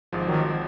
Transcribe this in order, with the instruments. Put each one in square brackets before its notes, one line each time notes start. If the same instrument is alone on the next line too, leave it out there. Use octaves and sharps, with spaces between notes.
[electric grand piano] G#1 G#2 F3
[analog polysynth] D#3 F#3